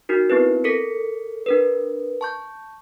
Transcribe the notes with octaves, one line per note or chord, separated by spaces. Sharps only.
D#4 F#4 A#4
B3 C4 E4 B4
A4 A#4 B6 C#7
D4 A#4 B4
A5 C#6 G6